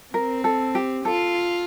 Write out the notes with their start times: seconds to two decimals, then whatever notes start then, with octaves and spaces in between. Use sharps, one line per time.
0.14 C4 A#4
0.44 A4
0.75 G4
1.05 F4 A4